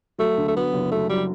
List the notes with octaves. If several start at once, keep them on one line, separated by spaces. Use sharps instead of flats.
F#3 A3
D3
A3
F#3 B3
F#1
F#3 A3
F#3 G3